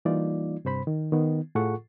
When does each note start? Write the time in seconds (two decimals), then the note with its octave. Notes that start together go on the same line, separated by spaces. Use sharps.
0.05 E3 G3 A#3 D#4 F4 D5
0.65 G2 C3 C5 B5
0.87 D#3
1.12 D#3 B3
1.55 A2 F4 G#4 A4 F#5 C#6